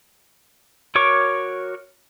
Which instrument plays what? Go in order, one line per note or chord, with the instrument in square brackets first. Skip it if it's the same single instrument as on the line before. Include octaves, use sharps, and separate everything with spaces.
[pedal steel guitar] F#4 A#4 C#5 C#6 D6